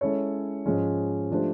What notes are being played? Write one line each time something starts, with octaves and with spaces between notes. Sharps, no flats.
G#3 C#4 E4 A4 C#5
G#2 F3 G#3 C#4
F3 A3 D4 G4 C5